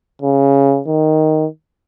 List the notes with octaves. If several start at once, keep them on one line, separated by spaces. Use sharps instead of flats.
C#3
D#3